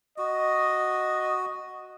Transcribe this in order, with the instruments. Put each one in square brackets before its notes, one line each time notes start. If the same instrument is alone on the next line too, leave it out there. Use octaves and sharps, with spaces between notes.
[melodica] F#4 [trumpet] D#5